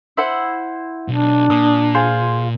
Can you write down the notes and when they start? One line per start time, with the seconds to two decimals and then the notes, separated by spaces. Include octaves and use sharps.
0.17 E4 C5 F#5
1.08 B1 D4
1.50 A#2 D#6
1.95 F4 G#4 C5